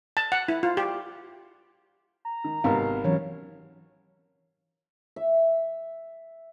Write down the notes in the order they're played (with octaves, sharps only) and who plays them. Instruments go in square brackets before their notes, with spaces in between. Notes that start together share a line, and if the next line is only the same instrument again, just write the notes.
[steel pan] A5
F#5
E4
F4
G4
[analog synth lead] A#5
[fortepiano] D#3
[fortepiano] G#1 C3 B3 [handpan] A#4 F5
[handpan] E3 F#3 C#4 [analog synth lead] C#5
[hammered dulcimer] E5